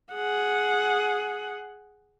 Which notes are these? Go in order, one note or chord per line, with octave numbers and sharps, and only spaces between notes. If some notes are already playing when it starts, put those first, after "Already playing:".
G#4 F#5